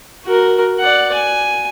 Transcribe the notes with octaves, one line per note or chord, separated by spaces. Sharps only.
F#4 A#4
D5 F#5
G#5